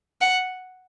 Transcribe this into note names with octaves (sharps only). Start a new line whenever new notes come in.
F#5